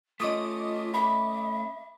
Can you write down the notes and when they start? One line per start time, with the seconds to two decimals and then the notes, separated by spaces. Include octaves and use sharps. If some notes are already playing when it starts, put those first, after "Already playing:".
0.20 A3 C#4 F4 D#5 D6 D#6
0.94 E5 B5